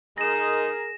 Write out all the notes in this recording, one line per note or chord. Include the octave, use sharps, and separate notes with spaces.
G#3 D#4 G#4 A#4 A#6 E7